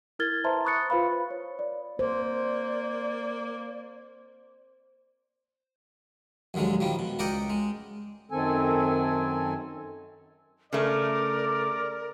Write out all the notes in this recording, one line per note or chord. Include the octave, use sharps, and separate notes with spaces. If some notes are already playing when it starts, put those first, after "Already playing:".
E4 A#4 F6 G#6 A6 G7
B4 C5 E5 A5 A#5 C6
B5 C#6 D#6 F#6 A6 C#7
F4 B4 C5 F5 B5
C#5
D5
A#3 C5 D5
A#1 D#2 D3 F#3 G#3
D#3 F3 G3
B2
C#2 A#4 D5 D#5 F#5 G5
G#3
F#2 D#3 C4 A4 G#5
C#3 A3 A#4 D5